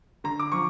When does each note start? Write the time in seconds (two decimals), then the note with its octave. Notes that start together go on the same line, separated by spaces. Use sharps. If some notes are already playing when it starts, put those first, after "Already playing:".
0.24 D3 A#5
0.40 D6
0.52 F3 C#6